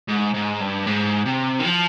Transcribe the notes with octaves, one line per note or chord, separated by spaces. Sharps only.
G#2
G#2
G2
G#2
C3
D#3
F3